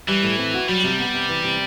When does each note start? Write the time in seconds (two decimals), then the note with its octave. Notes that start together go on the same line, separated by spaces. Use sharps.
0.08 E3 G3
0.23 A2
0.38 C4
0.54 F#4
0.68 F#3 G3
0.84 C3
0.99 B3
1.14 C3
1.29 E3
1.44 C3